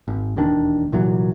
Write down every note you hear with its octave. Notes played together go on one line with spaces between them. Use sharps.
G#1
E1 D#2 D#3 D4
C2 A#2 E3 F#3